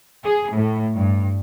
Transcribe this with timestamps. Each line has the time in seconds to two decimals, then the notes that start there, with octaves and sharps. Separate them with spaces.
0.24 G#4
0.55 A2
0.94 G2